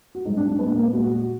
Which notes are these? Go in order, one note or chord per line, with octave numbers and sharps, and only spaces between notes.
F#4
G#2 F#3 D#4
D4
D4
A#2 G#3 B3
D4
A#3
B3
A#2 G#3 F#4
F#4
F#4